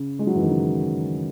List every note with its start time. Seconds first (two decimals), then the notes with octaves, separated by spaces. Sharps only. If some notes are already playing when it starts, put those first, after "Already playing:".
Already playing: C#3
0.19 G#3
0.27 F#3
0.36 E3
0.42 D#3
0.50 C#3